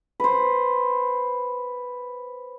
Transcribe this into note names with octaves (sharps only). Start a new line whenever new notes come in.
B4 C5